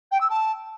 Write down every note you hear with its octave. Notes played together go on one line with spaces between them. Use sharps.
G5
E6
A5